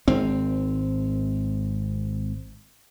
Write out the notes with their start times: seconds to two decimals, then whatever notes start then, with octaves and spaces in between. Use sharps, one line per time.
0.08 G#1 C4